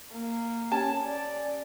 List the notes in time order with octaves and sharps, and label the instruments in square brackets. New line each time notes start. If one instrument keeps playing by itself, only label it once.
[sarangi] A#3
[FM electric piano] C#4 G4 G#5 [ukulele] A5
[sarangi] D5